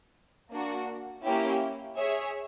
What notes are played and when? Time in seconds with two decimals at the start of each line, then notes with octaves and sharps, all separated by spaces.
0.51 A#3 D4 F#4
1.24 A#3 C#4 E4 G4
1.97 G#4 C#5 E5